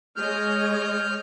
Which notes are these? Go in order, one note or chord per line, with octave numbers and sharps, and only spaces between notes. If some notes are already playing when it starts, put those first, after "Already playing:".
G#3 C#5 D#5 F6 G6